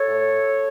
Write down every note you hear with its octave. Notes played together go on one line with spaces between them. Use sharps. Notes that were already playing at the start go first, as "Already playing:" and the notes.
Already playing: A4 C#5
A2